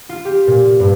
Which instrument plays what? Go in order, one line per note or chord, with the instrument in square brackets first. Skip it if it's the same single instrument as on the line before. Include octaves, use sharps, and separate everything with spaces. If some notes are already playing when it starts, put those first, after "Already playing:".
[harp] F4
G4
A#2
G2